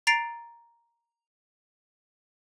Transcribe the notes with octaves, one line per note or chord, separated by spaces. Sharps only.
A#5 A6 C7 D7 F7